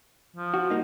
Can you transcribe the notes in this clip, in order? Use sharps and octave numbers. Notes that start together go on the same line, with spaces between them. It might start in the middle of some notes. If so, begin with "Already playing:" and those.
F3
F#4
G3 A#3 D#4